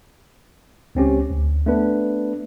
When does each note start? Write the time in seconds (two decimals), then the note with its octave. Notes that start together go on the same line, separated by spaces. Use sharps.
0.95 C#2 C4 C#4 G4
1.30 D2
1.66 A3 B3 D4 B4